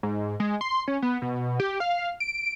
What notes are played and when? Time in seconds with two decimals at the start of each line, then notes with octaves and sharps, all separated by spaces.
0.03 G#2
0.40 G#3
0.61 C6
0.88 C#4
1.02 B3
1.22 B2
1.60 G4
1.80 F5
2.20 D7